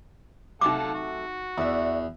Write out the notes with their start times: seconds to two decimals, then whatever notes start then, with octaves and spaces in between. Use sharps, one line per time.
0.61 C3 F#3 A3 D#4 A4 F5 F#5 D6
0.94 F#4
1.58 E2 D5 E5